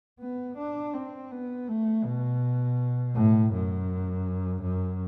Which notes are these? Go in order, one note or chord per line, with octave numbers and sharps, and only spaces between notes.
B3
D4
C4
B3
A3
B2
A2
F#2
F#2